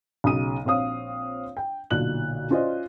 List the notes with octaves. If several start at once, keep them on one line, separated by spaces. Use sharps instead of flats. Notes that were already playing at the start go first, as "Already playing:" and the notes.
B1 C#3 D#6 D#7
A#1 C4 C#5 F5 D#6
G5
B1 A#2 D3 F#6 F#7
C#4 F4 C5 D5 D#5